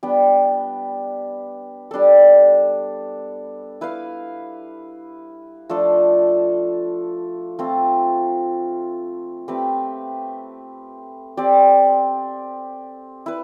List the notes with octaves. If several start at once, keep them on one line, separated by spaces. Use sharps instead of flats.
G3 B3 D4 G4
G3 D4 A4
E4 B4 F5
F3 A3 D4 A4
A3 C4 F4
A3 C4 G4 B4
C4 G4 D5
E4 B4